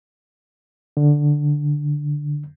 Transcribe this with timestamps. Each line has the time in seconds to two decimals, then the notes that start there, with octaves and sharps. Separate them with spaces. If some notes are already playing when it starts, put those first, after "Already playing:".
0.97 D3